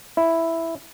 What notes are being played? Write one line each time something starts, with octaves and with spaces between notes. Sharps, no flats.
E4